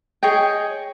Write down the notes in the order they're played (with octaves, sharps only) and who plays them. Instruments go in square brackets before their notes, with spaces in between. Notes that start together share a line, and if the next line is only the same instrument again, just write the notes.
[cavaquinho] G#4 C#5 D#5 G5